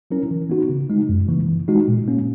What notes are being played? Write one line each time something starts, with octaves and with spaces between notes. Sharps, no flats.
F#3 C#4 E4 A#4
E3
B3 D#4 F#4
C#3
G#3 D#4
F#2
C#3 E3 A#3
E3
G#3 D#4 F#4
A#2
A#3 C#4